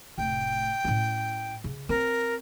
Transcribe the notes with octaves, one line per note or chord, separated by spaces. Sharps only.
F1 A2 G5
A2 C#4
C#3
C4 A#4